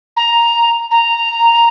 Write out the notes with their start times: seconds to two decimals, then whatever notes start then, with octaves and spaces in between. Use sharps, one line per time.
0.16 A#5
0.90 A#5